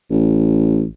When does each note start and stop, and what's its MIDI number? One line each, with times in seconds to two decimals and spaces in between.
0.10 0.85 33